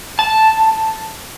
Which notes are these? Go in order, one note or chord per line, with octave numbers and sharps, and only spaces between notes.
A5